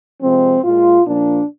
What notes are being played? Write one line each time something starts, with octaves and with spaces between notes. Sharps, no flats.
C3 F3 G#3 C4
A#2 G#3 F4
A#2 F3 A#3 D4